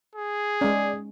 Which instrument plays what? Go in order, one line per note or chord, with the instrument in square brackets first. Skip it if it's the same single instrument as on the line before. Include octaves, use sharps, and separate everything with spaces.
[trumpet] G#4
[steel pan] G#3 C#4 [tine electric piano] D5